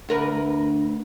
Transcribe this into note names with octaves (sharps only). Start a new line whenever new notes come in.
D2 A#4 B4